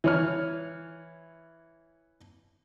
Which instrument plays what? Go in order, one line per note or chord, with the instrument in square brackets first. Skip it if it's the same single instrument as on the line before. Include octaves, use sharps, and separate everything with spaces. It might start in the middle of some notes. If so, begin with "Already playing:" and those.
[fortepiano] E3 C#5 F6